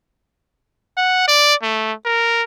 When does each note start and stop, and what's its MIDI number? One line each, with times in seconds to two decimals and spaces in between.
0.97 1.24 78
1.28 1.54 74
1.62 1.93 57
2.05 2.43 70